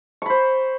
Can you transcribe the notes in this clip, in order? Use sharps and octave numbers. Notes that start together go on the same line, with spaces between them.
C5 B5 C#6